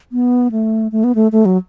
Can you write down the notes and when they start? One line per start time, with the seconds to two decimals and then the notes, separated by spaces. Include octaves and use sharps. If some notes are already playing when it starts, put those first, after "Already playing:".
0.12 B3
0.52 A3
0.92 A3
1.04 B3
1.15 A3
1.32 A3
1.45 F#3